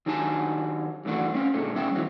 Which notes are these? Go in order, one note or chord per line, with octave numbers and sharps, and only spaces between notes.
D#3 F#3 D4 G4 G#5 A5
G2 E3 A3 C#4 D4 F#4
C4 C#4 E4 F4
A#2 D3 G#3 A3
G3 B3 C#4 E5 G5
E2 A2 D#3 E3 F#3